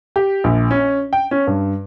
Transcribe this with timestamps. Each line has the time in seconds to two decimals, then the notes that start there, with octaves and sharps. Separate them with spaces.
0.16 G4
0.44 A#1
0.71 C#4
1.13 G5
1.31 C#4
1.47 G2